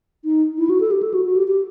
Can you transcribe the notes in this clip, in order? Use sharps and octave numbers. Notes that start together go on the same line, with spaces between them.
D#4
E4
F#4
A4
G4
A4
F#4
F#4
G4
G4